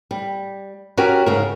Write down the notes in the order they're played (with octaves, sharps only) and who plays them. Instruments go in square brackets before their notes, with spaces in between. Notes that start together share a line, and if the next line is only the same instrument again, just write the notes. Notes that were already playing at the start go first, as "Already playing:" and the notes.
[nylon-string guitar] G3
C#4 F#4 G4 A#4
G#2 C#3 A#4